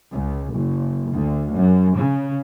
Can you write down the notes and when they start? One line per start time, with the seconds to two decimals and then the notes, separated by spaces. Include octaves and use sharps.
0.12 C#2
0.53 F#1
1.13 D2
1.55 F#2
1.97 C#3